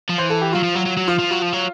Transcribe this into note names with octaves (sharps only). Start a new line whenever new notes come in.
F3
E3 C5
A4
G4
F#3 F4
F3
F#3
F#3
F#3
F3 F4
F3
F#3
F3
F#3